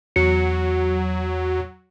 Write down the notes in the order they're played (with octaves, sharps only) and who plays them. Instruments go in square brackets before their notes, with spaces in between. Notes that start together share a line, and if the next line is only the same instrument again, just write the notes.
[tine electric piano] E2 F#4 C#7 [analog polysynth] F#3